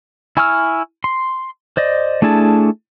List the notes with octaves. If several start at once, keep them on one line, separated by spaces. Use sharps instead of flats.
E4 G#5 C#6 E6 F6
C6
C5 D5 D#5
A3 D4 E4 G#4 A5